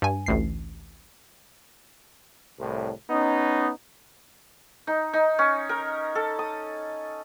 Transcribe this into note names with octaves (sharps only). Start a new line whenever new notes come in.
G2 G#5
A1 D2 C7
C2 A2
B3 C#4 D#4
D#4
D#4
C#4
A#4
A4
D#6